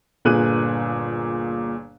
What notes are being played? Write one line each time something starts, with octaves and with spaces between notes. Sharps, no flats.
G1 A#2 G#4 F#6 D#7